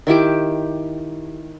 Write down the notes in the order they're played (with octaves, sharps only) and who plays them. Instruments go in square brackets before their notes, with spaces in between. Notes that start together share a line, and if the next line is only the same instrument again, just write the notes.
[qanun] D#3 E4 G4 D6